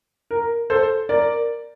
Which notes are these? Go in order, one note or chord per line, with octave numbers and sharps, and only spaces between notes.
A#4
A4 C5
A#4 D5